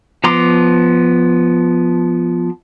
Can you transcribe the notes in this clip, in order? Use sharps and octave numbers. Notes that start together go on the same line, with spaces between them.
F3 B3 A#5 C6 D6